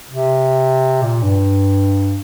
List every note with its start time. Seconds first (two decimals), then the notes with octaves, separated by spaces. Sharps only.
0.10 C3
1.03 A#2
1.23 G2